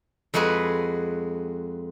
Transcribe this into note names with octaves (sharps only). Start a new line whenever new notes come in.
F2 G#3 F#4 G#4 B4